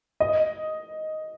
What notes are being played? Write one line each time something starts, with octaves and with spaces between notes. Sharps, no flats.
D#5